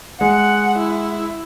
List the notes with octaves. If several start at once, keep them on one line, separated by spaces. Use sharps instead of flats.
G#3 F#5
E4